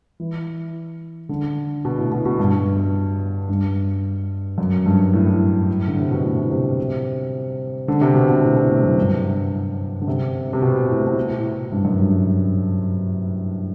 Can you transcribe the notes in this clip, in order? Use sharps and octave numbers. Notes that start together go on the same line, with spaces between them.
E3
D3
B2
A2
B2
B2
G2
G2
F#2
G2
A2
D3
C3
B2
A2
C3
D3
C3
B2
B2
A2
B2
A2
F#2
G2
D3
C3
C3
B2
A2
B2
A2
G2
F#2
G2